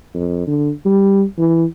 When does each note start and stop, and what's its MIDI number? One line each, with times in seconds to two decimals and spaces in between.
0.14 0.47 41
0.47 0.70 50
0.85 1.23 55
1.38 1.64 52